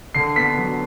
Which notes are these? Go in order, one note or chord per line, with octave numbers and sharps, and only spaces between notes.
D3 C7
B3 B6
F#3